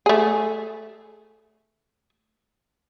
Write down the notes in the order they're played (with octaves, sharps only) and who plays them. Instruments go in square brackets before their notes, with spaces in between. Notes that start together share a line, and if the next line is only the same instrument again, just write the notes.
[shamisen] A3 G#4